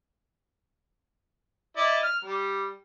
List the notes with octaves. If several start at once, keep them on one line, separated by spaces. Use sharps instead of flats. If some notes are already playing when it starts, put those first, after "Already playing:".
E4 D5 D#5
F6
G3